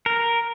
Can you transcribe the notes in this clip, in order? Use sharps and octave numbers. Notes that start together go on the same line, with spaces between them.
A#4